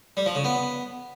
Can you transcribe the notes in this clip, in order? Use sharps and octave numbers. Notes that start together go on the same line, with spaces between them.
G3
F3
C#3
B3